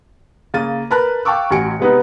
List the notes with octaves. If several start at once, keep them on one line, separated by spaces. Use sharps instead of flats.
C#3 A#3 A6 D#7
A#4 B4 A5 B5 F#6
F5 G5 A5 C#6 D6 E6
A1 F#4 G#5 C#7 D7
C3 G#3 B3 D#4 B4